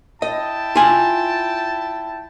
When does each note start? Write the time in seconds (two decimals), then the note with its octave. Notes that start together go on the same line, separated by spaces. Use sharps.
0.22 E4 D#5 G5 A5
0.76 F4 G#5